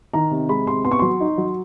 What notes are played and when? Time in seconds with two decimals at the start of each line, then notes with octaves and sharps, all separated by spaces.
0.14 D#3 A#5
0.31 C3
0.49 G#3 B5
0.66 C3 C6
0.84 B3 C6
0.91 C#6
0.99 F#3 C6
1.20 D#4
1.38 F#3